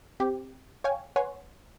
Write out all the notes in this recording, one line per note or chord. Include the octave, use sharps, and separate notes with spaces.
C4 G4
C#5 F5 G5 G#5
B4 C#5 F#5 G#5 C6